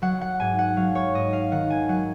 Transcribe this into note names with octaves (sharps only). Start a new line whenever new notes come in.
F#3 F#5
F#5
G#2 G#5
F#5
F#3 F5
C#5
G#2 D#5
F5
D#3 F#5
G#5
F#3 F#5